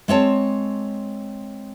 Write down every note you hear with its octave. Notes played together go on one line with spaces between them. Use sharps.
G#3 C4 C#5 A5